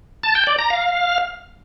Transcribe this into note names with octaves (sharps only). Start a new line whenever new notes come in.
A5
G5
D5
A#5
F5